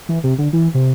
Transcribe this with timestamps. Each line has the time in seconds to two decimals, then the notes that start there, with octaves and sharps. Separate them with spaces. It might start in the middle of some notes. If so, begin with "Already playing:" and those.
0.09 E3
0.24 C3
0.38 D3
0.53 E3
0.74 C3